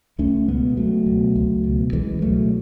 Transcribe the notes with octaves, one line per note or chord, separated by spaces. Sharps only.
C#2 A3 C#4
B2 G#3 B3
C#2 F#3 A3
B2
C#2
B2
C#2 E3 G#3
B2 F#3 A3